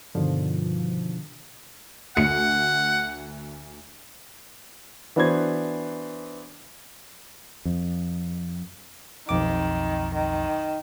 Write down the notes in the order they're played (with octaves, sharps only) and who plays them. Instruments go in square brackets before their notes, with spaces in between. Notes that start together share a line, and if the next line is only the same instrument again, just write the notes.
[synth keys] G2 B2 D3 D#3 F3
[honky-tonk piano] D2 C#7 [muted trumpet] F#5
[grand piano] E3 B3 D4 F#4 C5 G#6
[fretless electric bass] F2
[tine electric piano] B1 F2 D6 [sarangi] D#3
[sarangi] D#3